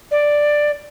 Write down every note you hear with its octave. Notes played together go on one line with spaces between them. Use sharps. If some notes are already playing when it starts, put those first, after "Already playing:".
D5